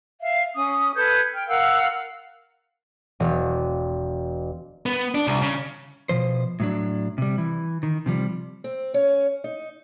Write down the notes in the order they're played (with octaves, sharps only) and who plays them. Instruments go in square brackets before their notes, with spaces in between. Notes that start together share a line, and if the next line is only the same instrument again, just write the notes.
[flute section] E5 F5
C#4 D#6
A4 B4 G6 G#6
G5 F6
A#4 F5 F#5 E6
[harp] E1
[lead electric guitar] B3
D4
C2
C#3
[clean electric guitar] B2 F3 C5
A2 F#3 D4
C3 G3
E3
D#3
C3 F3 G3
[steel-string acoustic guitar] C4
C#4
D#4